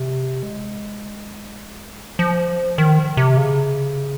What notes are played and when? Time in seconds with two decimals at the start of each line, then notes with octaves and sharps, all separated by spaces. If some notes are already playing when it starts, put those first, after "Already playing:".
Already playing: C3
0.43 G#3
2.19 F3
2.78 D#3
3.17 C3
3.37 C#3